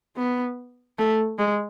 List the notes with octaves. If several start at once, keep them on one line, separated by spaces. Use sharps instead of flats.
B3
A3
G#3